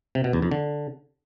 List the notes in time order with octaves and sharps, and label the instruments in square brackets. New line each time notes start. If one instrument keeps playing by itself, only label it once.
[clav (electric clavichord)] C3
B2
E2
F2
D3